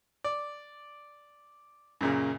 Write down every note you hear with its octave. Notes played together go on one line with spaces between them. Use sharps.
D5
F#2 A#2 C#3